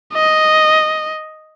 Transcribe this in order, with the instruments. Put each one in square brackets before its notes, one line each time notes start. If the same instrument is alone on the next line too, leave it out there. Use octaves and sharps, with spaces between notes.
[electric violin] D#5